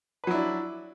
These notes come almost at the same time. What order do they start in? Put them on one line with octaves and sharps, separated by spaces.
B4 F#3 E4 D4